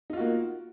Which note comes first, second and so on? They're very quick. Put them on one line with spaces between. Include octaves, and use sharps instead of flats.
D#4 F4 F#4 A#3